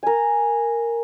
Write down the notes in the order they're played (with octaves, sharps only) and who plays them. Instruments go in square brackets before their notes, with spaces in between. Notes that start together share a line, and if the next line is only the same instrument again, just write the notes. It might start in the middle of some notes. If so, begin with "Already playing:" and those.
[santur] A#4 G#5